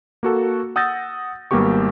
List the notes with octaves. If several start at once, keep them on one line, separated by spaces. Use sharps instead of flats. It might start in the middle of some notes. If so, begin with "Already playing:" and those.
A#3 F#4 A4
F#5 D#6 E6 G6 A6 A#6
G#1 G3 A#3 B3 G4 C#6